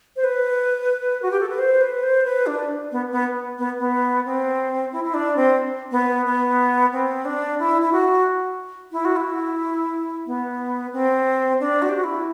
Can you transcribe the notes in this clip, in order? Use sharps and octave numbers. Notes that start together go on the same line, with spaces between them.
C5
B4
F#4
G4
A4
B4
C5
B4
C5
B4
D4
B3
B3
B3
B3
C4
E4
E4
D4
C4
B3
B3
C4
D4
E4
E4
F#4
E4
F#4
E4
B3
C4
D4
F#4
G4
F#4
E4